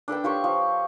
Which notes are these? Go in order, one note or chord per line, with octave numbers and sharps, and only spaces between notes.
D4 A4 B4 G5
F4 G4 C#5 C#6
F3